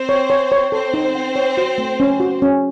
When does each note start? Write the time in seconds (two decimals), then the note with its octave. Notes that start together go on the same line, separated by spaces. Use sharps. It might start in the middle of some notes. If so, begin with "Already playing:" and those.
Already playing: C4 C5
0.09 C#5
0.30 C#5
0.52 C#5
0.72 C4 A4 C5
0.94 D#4
1.15 F#5
1.36 C#5
1.57 F#4
1.78 A3
2.00 C#4
2.20 F#4
2.42 C#4